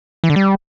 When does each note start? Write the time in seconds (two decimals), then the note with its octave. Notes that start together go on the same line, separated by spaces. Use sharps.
0.24 E3
0.30 D3
0.36 G3